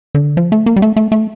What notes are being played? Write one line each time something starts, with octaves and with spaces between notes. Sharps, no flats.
D3
F3
A3
A#3
G3
A3
A3
A3